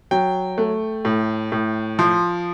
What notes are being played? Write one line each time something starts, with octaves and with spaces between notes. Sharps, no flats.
F#3 G5
A3
A2
A2
F3 C6